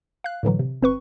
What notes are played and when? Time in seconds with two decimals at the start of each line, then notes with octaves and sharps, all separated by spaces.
0.24 F5 F#6
0.43 A2 D3 E3 F#3
0.59 C3
0.81 G1 C4 B4 C#6